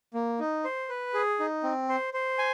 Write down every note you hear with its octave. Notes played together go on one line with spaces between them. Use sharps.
A#3
D#4
C5
B4
G#4
D#4
C4
C5
C5
G#5